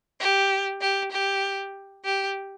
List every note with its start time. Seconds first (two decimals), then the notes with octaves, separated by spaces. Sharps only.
0.20 G4
0.81 G4
1.11 G4
2.05 G4